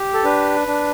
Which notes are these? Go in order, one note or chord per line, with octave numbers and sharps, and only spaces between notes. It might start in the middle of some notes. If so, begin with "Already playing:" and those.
Already playing: G4
A4
D4 B4
D4